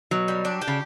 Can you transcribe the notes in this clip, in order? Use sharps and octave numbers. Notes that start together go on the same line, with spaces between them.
B2 F#3
G3
D4
G4
C#3